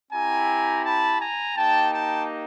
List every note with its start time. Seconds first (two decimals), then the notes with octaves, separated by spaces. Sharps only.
0.11 C4 E4 G4 G#5 A#5
0.83 A5 B5
1.20 G#5 A#5
1.56 A#3 D#4 G4 G5 A5
1.91 G5 A5